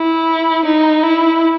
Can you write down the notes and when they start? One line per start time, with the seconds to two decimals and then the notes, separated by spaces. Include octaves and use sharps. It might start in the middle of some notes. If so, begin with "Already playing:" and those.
Already playing: E4
0.65 D#4
1.03 E4